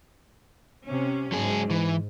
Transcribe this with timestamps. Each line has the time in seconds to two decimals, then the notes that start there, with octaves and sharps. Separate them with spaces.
0.86 C3 C#4
1.32 G#2 F#3 G#4
1.70 E3